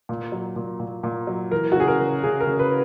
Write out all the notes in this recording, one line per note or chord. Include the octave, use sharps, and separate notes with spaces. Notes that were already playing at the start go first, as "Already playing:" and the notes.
A#2
F#3
A#2
A#2
A#2
F#3
E3 A#4
F#4
C#3 G#4
A#4
C#3
C#3 G#4
A#4
C#3
B4